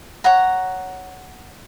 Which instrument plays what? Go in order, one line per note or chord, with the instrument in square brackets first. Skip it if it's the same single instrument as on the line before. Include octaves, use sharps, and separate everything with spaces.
[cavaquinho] C#5 F#5 A#5